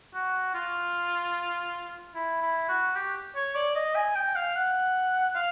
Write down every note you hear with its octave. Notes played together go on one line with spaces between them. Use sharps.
F#4
F4
E4
E4
F#4
G4
C#5
D5
D#5
G#5
G5
F5
F#5
F5